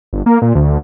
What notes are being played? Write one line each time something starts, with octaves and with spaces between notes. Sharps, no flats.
G1
A#3
A#2
D2